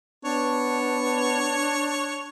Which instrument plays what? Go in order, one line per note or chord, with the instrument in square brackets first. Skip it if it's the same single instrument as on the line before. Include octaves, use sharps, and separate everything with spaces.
[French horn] B3 [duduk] D4 [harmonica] C#5